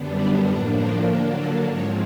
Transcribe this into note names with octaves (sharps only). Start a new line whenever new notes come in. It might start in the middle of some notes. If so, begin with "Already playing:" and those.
Already playing: F#2 D3 G3 B3 D4
G#5
A2 F3 A#3 D4 A#5
G5
D3 F#3 A#3 D4 G5
F#5
G#2 F3 G#3 C4 C#5